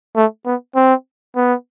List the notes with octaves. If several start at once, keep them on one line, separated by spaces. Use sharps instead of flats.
A3
B3
C4
B3